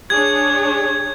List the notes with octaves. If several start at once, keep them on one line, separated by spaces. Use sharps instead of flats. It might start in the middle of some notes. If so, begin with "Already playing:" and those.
D4 G#4 C#5 G#6